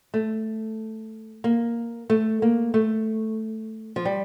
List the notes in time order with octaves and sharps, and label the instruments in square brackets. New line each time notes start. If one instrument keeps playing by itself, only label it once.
[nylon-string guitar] A3
A#3
A3
A#3
A3
F3
G3